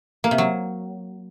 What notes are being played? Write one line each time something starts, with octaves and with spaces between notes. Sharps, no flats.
A#3
C3
F#3